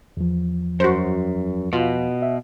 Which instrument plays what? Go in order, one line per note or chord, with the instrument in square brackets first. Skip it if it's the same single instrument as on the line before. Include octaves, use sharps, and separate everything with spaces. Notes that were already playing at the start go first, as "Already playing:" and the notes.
[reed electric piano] E2 F3
[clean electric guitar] F#2 [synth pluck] F#4 C5
[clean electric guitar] B2 [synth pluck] F4
[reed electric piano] E5